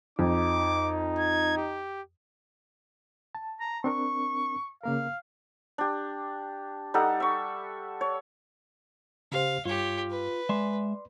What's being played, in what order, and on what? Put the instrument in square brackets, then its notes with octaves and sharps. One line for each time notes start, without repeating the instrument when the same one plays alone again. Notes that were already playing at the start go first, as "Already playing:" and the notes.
[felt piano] F2 [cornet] D#4 [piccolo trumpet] D6
[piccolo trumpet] G#6
G4
[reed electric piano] A5
[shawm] A#5
[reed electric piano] C4 D4 A#4 [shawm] C#6
[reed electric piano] C#3 A#3 A#4 [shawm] F5
[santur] D4 G4
G3 D#4 A4 F#5
E5 C#6
C#5
[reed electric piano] C#3 G4 C5 [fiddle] F5
[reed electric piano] G2 [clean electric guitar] F4 [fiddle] G4 C#5
[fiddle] B4
[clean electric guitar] G#3 E5 G#5 [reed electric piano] D5 C6